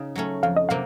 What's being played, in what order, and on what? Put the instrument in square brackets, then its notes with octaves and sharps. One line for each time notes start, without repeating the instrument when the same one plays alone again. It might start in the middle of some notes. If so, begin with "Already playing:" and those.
Already playing: [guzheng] C#3 D#4
F#3 A3 C#4
[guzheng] F2 [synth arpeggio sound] F5
[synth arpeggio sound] D#5
[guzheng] C3 F#3 A#3 [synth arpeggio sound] F5